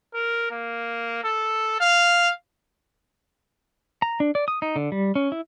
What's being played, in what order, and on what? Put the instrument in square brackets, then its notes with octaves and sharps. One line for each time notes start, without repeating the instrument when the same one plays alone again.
[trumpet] A#4
A#3
A4
F5
[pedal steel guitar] A#5
D4
D5
D#6
D#4
D3
G3
C#4
E4